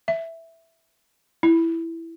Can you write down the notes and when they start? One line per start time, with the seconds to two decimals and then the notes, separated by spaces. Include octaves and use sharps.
0.08 E5
1.43 E4